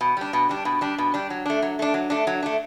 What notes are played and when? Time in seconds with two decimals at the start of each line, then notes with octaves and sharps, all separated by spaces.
0.01 B2
0.17 G3 D4
0.33 B2
0.49 G3 D4
0.65 B2
0.81 G3 D4
0.98 B2
1.14 G3 D4
1.30 F#3
1.46 A3 D4
1.62 F#3
1.79 A3 D4
1.94 F#3
2.10 A3 D4
2.27 F#3
2.43 A3 D4